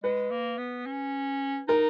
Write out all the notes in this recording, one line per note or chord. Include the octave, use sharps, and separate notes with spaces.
G#3 B4
A#3
B3
C#4
D#4 A#4